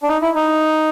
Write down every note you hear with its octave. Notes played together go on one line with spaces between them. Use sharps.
D4
D#4
E4
D#4